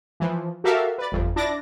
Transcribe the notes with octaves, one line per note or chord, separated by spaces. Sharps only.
E3 F3
F#4 G4 A4 A#4 E5 F5
B4 D5
G1 F2
D4 E4 D6 A6 A#6